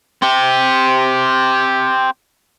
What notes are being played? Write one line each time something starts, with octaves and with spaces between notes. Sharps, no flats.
C4 G4